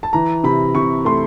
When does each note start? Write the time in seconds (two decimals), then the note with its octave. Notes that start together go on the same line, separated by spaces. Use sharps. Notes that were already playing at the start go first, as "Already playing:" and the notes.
0.03 A5
0.13 E3 A#5
0.44 C3 B5
0.75 C3 C#6
1.05 A3 C6